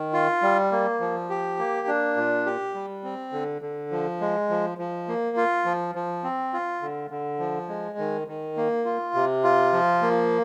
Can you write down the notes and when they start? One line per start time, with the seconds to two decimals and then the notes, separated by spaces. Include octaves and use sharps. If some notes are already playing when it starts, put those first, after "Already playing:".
Already playing: D#3
0.13 F4
0.42 G3
0.72 A#3
1.00 F3
1.30 G4
1.58 A#3
1.87 D4
2.17 A#2
2.46 G4
2.74 G3
3.04 C4
3.33 D3
3.62 D3
3.91 F3
4.21 G#3
4.50 F3
4.78 F3
5.08 A#3
5.37 F4
5.65 F3
5.95 F3
6.24 C4
6.53 F4
6.82 D3
7.11 D3
7.39 F3
7.69 G#3
7.98 D#3
8.28 D#3
8.57 A#3
8.85 F4
9.15 C3
9.44 F4
9.73 F3
10.02 A#3